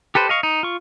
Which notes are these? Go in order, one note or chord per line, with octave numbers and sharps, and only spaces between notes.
G4 A4 B4 C5
D#5 F5 C#6
D#4
F4 C#6